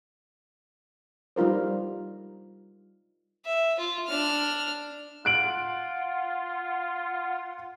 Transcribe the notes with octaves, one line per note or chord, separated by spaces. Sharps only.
G3 D#4 F4 A#4 C5
E5
F4
D4 F6
F4 F#5 F#6 D7 F#7